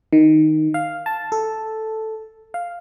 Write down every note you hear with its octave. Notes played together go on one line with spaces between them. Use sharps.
D#3
F5
A5
A4
F5